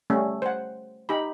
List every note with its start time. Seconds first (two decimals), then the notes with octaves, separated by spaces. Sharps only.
0.10 G3 A3 C#4
0.42 C5 F#5
1.09 D#4 G4 B5